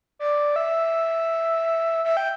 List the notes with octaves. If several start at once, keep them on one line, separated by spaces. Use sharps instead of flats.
D5
E5
E5
G5